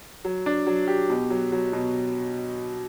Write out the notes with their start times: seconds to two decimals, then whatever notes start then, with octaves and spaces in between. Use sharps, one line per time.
0.25 F#3
0.46 D4
0.67 F#3
0.87 G4
1.10 B2
1.30 F#3
1.52 F#3
1.73 B2